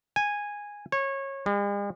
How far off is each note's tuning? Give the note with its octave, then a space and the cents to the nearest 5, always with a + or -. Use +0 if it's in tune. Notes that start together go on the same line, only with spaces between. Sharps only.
G#5 -10
C#5 -25
G#3 -45